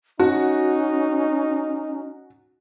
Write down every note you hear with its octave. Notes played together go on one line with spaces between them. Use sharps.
C#4 D#4 F#4